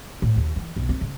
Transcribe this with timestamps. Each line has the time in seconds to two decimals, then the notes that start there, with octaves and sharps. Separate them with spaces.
0.22 A2
0.36 D#2
0.56 E3
0.76 B1
0.89 C4
1.01 C#3